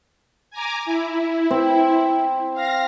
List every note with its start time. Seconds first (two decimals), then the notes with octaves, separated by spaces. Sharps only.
0.50 G#5 A#5 D6
0.85 E4
1.51 C4
2.54 F5 A#6